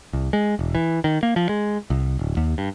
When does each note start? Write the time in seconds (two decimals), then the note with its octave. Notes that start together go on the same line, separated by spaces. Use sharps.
0.13 C2
0.33 G#3
0.59 E1
0.75 E3
1.04 D#3
1.23 A#3
1.36 F3
1.49 G#3
1.90 C2
2.19 D1
2.37 D#2
2.58 G2